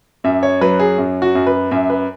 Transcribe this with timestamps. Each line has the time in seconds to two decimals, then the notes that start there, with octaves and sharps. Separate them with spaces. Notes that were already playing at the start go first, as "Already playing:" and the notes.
0.24 F#2 E5
0.43 C#5
0.61 F#3 B4
0.80 G#4
0.98 F#2
1.22 F#4
1.35 F#2
1.47 B4
1.71 F#2 E5
1.90 B4